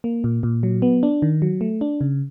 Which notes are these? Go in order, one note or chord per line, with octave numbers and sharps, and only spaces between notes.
A#3
A#2
A#2
F#3
B3
D4
D#3
F#3
A3
D4
C#3